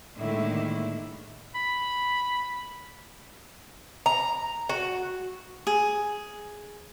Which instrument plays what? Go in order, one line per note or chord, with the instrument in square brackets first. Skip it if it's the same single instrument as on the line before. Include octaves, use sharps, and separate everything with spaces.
[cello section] A2 D3 D#3 G#3 A#3 E4
[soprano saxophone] B5
[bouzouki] A#5
F#4
[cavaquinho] G#4